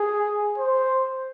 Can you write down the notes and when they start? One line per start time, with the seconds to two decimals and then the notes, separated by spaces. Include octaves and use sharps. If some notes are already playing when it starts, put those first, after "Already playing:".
Already playing: G#4
0.58 C5